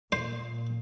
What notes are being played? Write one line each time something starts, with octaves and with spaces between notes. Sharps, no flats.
A#2 C5